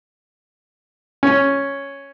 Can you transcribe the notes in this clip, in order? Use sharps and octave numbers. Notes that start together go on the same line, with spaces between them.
C#4